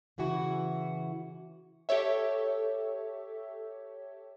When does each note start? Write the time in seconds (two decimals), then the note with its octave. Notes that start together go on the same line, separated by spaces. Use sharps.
0.18 C#3 E3 E4 F#4
1.89 G4 A4 C#5 E5